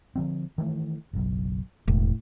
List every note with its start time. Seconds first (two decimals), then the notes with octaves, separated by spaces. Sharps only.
0.16 D3 F3 C4
0.58 D#3 E3 A3
1.13 F#1 B1
1.88 E1 A2